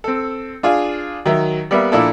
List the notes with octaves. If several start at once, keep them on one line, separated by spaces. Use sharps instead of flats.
C4 A4
D4 F4 G#4
D#3 F#3 E5
G3 A#3 B3 D5 E5
A#2 F3 D4 E4 F4 A4